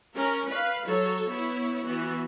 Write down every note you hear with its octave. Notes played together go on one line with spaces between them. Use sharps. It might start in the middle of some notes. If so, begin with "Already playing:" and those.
C#4 A#4
B4 F5
F#3 A4 C#5
B3 E4 C#5
E3 B3 F#4